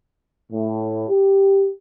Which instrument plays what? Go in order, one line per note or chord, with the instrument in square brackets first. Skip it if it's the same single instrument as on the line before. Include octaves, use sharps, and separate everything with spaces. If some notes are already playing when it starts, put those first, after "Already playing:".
[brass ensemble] A2
G4